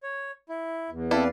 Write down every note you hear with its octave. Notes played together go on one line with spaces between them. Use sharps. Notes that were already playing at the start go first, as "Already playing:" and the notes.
C#5
E4
E2
C4 E4 A4 B4 D5 F5